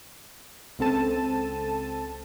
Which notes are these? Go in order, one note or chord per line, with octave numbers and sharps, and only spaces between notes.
C#2 C4 A4 A5 D#7